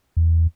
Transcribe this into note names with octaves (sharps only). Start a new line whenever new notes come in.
E2